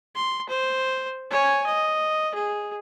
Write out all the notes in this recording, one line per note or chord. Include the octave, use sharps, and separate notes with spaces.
C6
C5
C#5 G#5
D#5
G#4